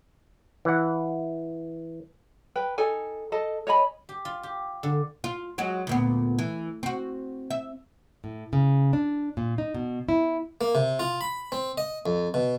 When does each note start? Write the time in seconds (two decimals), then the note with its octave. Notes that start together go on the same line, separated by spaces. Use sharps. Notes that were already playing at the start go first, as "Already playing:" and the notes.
0.65 E3 F#5
2.56 B4 G5
2.78 D#4 A4 G#5
3.32 A4 D#5 A5
3.67 C#5 D#5 G#5 B5
4.09 G4
4.25 F4
4.43 G4
4.83 D3
5.24 F4
5.58 F#3 G#3 F#4
5.87 D2 A#2 B3
6.39 E3
6.83 C4 F#4
7.50 E5
8.24 A2
8.53 C#3
8.93 D4
9.37 A#2
9.58 D#4
9.75 B2
10.09 E4
10.61 A#3
10.75 C3
10.99 F4
11.21 B5
11.52 C4
11.78 D#5
12.06 F2
12.34 B2